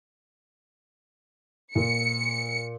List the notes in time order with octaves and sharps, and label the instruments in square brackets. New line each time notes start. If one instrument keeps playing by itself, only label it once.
[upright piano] A#2 [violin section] C#7